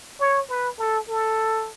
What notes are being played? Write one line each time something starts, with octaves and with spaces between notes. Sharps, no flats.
C#5
B4
A4
A4